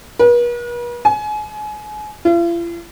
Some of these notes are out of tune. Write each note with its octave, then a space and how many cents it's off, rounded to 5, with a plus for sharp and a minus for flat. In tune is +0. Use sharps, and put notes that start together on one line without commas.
B4 -45
G#5 +30
F4 -45